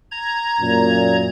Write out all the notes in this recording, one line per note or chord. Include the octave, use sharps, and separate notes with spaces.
A#5 G#6
F#2 A#2